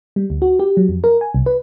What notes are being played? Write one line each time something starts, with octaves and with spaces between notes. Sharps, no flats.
G3
D2
F#4
G4
F#3
F2
A#4
G#5
C2
B4